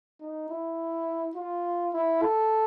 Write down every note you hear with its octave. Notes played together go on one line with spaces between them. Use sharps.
D#4
E4
F4
E4
A4